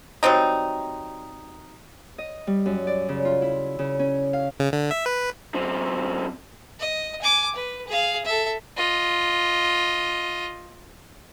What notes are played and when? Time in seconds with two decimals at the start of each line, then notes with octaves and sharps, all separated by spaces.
0.23 F#3 G3 C4 D#4
2.18 D#5
2.47 G3
2.66 F#2
2.87 D5
3.09 C#3
3.25 F4
3.42 E4
3.79 C#3
3.99 C#4
4.33 F5
4.60 C#3
4.73 D3
4.91 E5
5.06 B4
5.54 F#2 C4
6.80 D#5
7.22 G#5 D6
7.56 B4
7.88 G#4 F5
8.25 A4 E5
8.76 F4 D#5